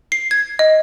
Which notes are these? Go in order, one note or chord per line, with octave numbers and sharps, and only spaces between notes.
C7
G#6
D#5